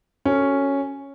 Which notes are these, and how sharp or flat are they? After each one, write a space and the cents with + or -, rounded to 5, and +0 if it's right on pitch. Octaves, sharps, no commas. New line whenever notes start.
C#4 +0 F#4 +0 A4 +20